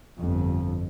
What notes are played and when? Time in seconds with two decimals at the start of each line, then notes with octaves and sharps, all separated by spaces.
0.18 G1 F2